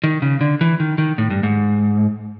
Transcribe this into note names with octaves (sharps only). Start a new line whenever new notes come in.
D#3
C#3
D3
E3
D#3
D#3
A2
G2
G#2